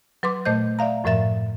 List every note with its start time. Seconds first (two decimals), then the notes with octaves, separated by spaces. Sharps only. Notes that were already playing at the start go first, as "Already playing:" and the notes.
0.23 F#3 B4 C6 D6
0.45 A#2 A3 C5 D#5 G6
0.79 D5 E5 F5 A#5
1.04 F#2 A2 F3 A#4 E5 A6